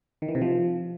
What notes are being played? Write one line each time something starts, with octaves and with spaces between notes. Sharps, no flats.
D#3
E3
C3
F3